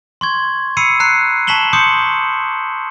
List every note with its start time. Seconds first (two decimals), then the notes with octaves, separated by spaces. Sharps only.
0.21 C6 C#6 G#6
0.77 B5 E6 C7 C#7 D#7
1.00 A#5 F#6 C7 C#7
1.47 A5 C#6 B6 E7 F#7 G7
1.73 C6 D6 D#6 G6 C#7